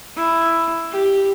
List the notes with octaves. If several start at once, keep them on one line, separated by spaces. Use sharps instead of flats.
E4
G4